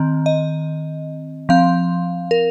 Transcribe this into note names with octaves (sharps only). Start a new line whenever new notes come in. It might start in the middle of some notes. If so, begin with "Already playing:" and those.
Already playing: D#3 C4
D#5
F3 C4 F5
A#4